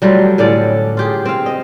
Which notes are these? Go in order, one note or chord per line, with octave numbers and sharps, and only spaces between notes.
F#3 G3 A3 F4
A2 D3 C#4 D5
F4 G4 G#4
C4 F5
D#5